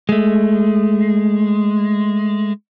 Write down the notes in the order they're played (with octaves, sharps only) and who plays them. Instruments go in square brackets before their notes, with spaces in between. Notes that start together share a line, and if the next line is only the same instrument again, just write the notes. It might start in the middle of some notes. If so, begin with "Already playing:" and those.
[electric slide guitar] G#3 A3